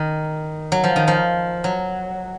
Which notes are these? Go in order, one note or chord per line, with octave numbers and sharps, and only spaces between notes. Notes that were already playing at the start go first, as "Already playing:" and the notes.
Already playing: D#3
F#3
F3
D#3
F3
F#3